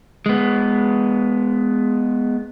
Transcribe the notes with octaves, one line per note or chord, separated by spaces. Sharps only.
G#3 B3